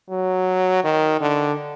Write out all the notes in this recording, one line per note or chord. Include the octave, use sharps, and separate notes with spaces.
F#3
D#3
D3